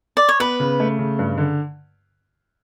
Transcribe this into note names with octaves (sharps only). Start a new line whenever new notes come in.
D5
C#5
B3 B4
C#3
A3
C#3
G2
D3